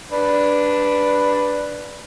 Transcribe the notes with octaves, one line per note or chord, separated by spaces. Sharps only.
D4 B4